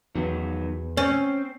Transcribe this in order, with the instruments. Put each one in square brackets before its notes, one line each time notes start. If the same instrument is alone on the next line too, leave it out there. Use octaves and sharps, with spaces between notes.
[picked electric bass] E2 [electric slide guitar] D#3 F#3 B3
[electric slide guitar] C4 [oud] C#4